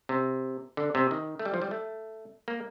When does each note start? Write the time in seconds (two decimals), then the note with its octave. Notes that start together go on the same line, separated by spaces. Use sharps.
0.09 C3
0.77 D3
0.95 C3
1.11 D#3
1.39 A3
1.45 G3
1.54 F3
1.62 G3
1.71 A3
2.48 A#3